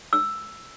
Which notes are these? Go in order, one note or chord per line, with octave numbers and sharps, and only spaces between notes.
E6